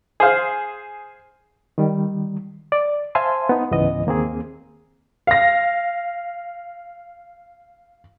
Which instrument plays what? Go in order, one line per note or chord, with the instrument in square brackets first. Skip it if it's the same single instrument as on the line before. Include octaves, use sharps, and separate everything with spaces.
[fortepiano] G#4 C5 F5
[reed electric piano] D#3 G3
D5
C5 E5 F5 G#5 A5 C6
B3 D#4
C#2 G#2 E3 B3 D#5
D#2 A#3 C4 G#4
[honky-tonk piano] F5 A#6